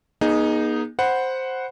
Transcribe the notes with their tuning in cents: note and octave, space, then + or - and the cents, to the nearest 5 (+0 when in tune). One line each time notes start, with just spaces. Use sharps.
B3 -45 D#4 -5 G#4 +0
C5 +0 F#5 +0 B5 +0